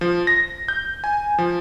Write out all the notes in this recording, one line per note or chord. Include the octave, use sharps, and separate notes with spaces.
F3
A#6
G6
G#5
F3